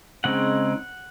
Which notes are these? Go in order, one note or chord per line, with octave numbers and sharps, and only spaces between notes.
C#3 G#3 C4 D#4 F#5